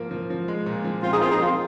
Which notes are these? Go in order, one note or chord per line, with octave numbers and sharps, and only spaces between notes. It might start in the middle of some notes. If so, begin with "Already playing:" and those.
Already playing: G#2 F3 A#3
F3
F3
G#3
A#2
F3
F3 C4 F4
D#4 G#4
A#3 C4 F4
D#4 G#4
F3 C4 F4